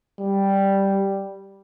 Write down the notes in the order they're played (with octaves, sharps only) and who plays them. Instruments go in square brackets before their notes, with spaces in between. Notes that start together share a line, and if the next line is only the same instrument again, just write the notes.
[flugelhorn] G3